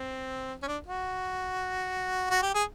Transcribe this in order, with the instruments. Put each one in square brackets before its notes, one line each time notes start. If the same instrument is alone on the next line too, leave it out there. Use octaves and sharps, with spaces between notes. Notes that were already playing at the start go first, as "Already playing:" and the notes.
Already playing: [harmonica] C4
C#4
D4
F#4
F#4
G4
G#4